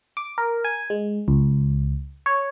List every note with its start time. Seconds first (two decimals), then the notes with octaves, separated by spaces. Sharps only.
0.17 D6
0.38 A#4
0.65 G#5
0.90 G#3
1.28 C#2
2.26 C#5